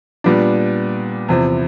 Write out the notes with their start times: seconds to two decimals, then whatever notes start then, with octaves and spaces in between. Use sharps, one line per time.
0.24 A#2 G3 B3 D4
1.29 E2 C3 F3